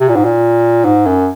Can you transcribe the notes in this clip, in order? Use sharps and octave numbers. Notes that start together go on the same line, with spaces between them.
C3
A#2
G#2
A#2
G#2
F#2